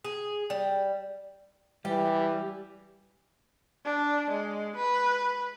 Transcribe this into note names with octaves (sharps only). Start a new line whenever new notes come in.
G#4
G3
E3 G3 G4
D4
G#3
B4